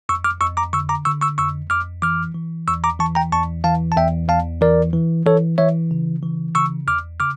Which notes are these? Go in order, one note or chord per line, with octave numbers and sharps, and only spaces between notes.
F2 C#6 E6
D6 F6
F2 C#6 E6
A#5 D6
D3 C#6 E6
A#5 D6
D3 C#6 E6
C#6 E6
F2 C#6 E6
F2 D6 F6
E3 D6 F6
E3
E2 C#6 E6
A#5 D6
E3 A5 C#6
G5 A#5
E2 A5 C#6
E3 F5 A5
A5
E2 E5 G5
E2 F5 A5
E3 A#4 D5
E3
E3 A4 C#5
E3 C#5 E5
C#3
E3
C#3 C#6 E6
E2 D6 F6
C#3 D6 F6